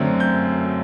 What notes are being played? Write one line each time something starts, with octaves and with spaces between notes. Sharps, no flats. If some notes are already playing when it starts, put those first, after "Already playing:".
Already playing: F#2 D3 F#3 A3 C4
G6